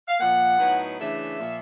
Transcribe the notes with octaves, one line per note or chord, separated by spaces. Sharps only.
F5
A#2 F3 A#3 F#5
A2 F#3 B3 D#4
C#3 E3 A3 D4 E5
A#2 F3 A#3